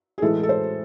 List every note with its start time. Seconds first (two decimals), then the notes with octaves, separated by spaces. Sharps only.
0.18 G#4
0.22 A2 E3 G#3 A4
0.43 A4
0.49 C5